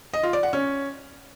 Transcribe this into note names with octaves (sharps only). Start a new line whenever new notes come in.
D#5
F4
D5
F#5
C#4